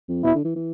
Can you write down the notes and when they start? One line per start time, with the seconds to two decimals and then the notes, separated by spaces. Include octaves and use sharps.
0.09 F2
0.23 B2 E4
0.35 D3
0.45 E3
0.56 E3